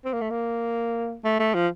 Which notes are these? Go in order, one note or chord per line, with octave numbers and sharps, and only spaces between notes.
C4
A#3
A3
A#3
A3
A3
F3